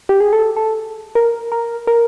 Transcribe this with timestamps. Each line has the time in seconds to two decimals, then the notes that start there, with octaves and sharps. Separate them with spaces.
0.09 G4
0.20 G#4
0.33 A4
0.57 A4
1.15 A#4
1.52 A#4
1.87 A#4